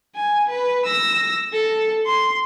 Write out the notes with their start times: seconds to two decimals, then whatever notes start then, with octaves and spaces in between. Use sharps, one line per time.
0.15 G#5
0.49 B4
0.85 E6 A#6
1.53 A4
2.06 C6